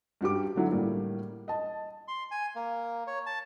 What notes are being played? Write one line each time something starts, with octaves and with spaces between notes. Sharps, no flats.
G2 F#4 G4 D6
D3 F#3 E4
A2 G3 A#3
D#5 A5
C6
G#5
A#3
C#5
A5